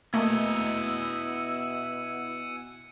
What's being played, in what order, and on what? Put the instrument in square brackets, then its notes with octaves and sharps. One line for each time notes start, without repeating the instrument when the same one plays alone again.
[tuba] B2 [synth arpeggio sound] A3 A#3 [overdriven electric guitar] E4 D#5 [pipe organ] F#5 G#5 E6